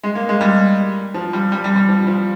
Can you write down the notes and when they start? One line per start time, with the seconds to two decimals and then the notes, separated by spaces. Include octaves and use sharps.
0.03 G#3
0.15 A#3
0.29 G#3
0.41 G3
1.14 F3
1.33 G3
1.52 G3
1.64 G3
1.76 G3
1.89 F3
2.07 F3